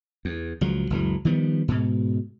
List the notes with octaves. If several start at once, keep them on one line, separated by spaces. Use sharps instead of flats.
E2
C#2 F3 F#3
F#1 C#2 E3 F#3
D#3 F3 G3 B3
G#2 B2